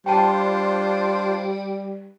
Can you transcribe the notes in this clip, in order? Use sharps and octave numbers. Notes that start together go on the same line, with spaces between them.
G3 D4 F4 C5 G5 A5